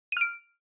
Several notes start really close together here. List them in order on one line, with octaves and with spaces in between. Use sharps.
D#7 F6 D7